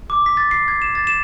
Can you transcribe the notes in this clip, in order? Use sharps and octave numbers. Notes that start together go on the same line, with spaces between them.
D6
B6
A6
C7
G#6
E7
A6
E7